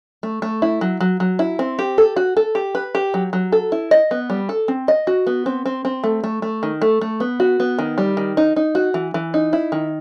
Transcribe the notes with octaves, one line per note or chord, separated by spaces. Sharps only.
A3
A3
E4
F#3
F#3
F#3
E4
C4
G4
A4
F#4
A4
G4
B4
G4
F#3
F#3
A4
E4
D#5
B3
G3
A4
C4
D#5
F#4
B3
C4
C4
C4
A3
A3
A3
D#3
A3
A3
B3
F#4
B3
D#3
G3
D#3
D#4
D#4
F#4
E3
E3
D#4
E4
D#3